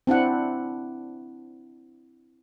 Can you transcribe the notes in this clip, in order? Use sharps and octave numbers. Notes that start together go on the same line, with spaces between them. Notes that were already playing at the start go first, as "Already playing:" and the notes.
C4 D4 E4 F#5